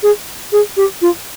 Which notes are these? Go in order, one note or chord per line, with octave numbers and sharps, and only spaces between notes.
G#4
G#4
G4
F4